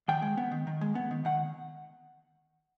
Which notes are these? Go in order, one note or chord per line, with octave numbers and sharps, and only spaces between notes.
D#3 G5
G#3
B3
D#3
D#3
G#3
B3
D#3
D#3 F#5